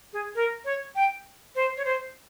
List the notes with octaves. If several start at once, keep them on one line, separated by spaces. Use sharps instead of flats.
G#4
A#4
C#5
G5
C5
C#5
C5